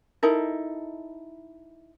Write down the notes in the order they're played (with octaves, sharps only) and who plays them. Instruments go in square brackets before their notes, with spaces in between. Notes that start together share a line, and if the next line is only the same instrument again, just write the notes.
[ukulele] D#4 E4 A4 A#4